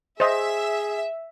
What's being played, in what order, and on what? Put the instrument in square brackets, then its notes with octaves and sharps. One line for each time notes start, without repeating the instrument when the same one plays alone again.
[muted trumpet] G#4 [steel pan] C5 D#5 [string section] E5